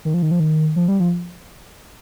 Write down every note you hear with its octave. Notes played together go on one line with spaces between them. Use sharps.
D#3
F3
D#3
F3
D#3
F3
G3
F3